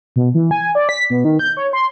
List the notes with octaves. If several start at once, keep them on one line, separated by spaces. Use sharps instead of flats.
B2
E3
G#5
D5
B6
B2
D#3
G6
C#5
C6